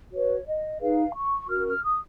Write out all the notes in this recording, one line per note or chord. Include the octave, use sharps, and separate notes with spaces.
F#4 B4 C#5
D#5
D#4 G#4 B4 F5
C#6
C#4 F#4 A#4 F6
F6
D#6